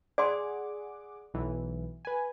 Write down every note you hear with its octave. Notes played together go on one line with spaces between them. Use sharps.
G#4 D5 F#5 C6 D6
B1 E3
B4 G#5